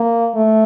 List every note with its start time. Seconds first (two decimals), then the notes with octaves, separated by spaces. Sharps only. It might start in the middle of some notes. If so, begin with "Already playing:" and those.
Already playing: A#3
0.35 A3